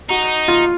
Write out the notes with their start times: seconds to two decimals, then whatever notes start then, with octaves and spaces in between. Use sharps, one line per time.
0.09 D#4 F#4
0.48 F4